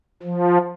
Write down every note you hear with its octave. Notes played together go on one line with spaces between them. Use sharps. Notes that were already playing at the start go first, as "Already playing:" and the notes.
F3